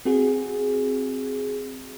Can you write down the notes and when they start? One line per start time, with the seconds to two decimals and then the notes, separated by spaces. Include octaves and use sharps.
0.05 C4 F#4 G#4